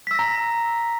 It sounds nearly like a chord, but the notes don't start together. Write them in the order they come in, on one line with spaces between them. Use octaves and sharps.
B6 E6 A#6 A#5